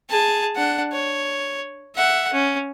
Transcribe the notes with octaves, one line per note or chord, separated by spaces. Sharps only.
G#4 A5
D4 F#5
C#5
E5 F#5
C#4